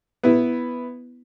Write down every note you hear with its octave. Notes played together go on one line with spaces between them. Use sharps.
B3 E4